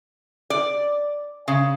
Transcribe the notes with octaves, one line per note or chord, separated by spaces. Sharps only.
D5
C#3